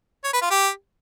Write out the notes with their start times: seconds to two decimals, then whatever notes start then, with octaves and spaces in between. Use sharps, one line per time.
0.24 C#5
0.33 B4
0.42 F4
0.51 G4